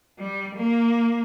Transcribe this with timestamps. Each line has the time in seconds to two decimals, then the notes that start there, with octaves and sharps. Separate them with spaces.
0.19 G3
0.56 A#3